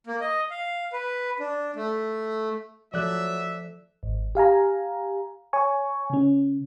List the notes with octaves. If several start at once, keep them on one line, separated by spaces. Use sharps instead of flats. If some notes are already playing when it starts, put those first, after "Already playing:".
A#3
D#5
F5
B4
D4
A3
F3 F#3 A4 D5 E5 F#6
G#1
G4 F5 G#5 A#5
C#5 G#5 C#6
C#3 C#4